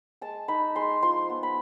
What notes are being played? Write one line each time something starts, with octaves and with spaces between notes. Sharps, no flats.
G#3 A5
D#4 B5
G#3 C6
F3 C6
B3
B5